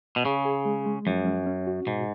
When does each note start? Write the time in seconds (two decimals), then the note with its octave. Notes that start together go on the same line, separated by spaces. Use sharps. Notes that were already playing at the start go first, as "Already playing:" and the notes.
0.16 B2
0.25 C#3 G#4
0.45 G#4
0.65 G#3
0.86 G#3
1.06 F#2 F3
1.26 C#4
1.47 C#4
1.67 F#4
1.86 G#2 B2